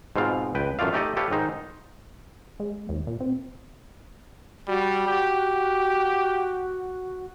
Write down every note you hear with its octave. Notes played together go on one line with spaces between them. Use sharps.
G#2 B2 C4 F4 F5
C#2 B4 G5
A1 F#2 A3 F4 D5 F5
A3 D#4 G4 A4 D5 D#5
G4 A4 B4 C#5 F5
G#2 D#3 D#4 C5
G#3
D#2
A#2
C4
G3 F#4
G4